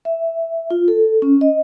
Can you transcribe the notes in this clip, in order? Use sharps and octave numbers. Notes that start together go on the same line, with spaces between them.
E5
F4
A4
C#4
D#5